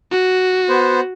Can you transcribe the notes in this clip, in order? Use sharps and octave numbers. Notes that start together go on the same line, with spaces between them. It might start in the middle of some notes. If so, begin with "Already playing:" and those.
F#4
B3 C5